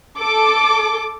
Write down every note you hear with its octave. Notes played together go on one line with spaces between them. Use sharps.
A4 D6